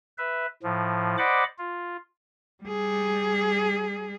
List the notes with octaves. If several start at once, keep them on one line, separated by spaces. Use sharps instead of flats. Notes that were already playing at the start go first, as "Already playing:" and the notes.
B4 E5
A2 F3
C5 D5 D#5 F#5 B5 D6
F4
G3 G#4